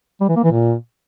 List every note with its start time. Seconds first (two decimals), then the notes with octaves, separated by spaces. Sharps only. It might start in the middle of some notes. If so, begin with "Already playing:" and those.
0.20 G3
0.28 E3
0.36 A#3
0.44 E3
0.51 A#2